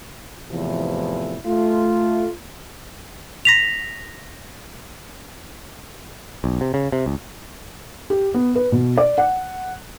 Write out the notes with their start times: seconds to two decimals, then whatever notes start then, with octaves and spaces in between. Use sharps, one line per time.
0.51 E2 A2 C3 E3 F3 E4
1.46 A3 F4
3.45 A#6 B6 F7
6.44 B1
6.61 C3
6.74 C#3
6.92 C3
7.06 C#2
8.10 G4
8.34 B3
8.55 B4
8.72 B2
8.97 D5
9.18 F#5